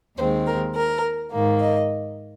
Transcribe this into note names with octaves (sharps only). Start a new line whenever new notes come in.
D#2 D#3 G#3 C4 C5
A#4
A#4
G#2 D#3 A#3
D#5